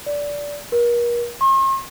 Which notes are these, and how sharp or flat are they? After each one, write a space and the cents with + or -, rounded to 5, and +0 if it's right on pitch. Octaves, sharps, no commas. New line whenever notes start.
D5 -15
A#4 +40
C6 +45